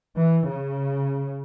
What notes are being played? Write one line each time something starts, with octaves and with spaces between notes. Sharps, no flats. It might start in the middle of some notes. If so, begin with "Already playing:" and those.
E3
C#3